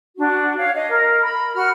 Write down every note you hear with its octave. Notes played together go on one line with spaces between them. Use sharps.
D4 F#4
C#5 F5
D#5
A#4
B5
F#4 F6